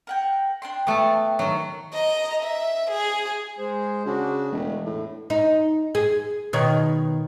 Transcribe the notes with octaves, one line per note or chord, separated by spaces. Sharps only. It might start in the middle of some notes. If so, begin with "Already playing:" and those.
A#4 F#5 G5
D4 G5 C6
A3 B3 G5 A5
D#3 F#3 F#5
D#5 A#5
E5
G#4
G#3 G#4 C5
C#3 D4 F#4
E1 A3
A2 D3
D#4
G#4
B2 D#3 C#5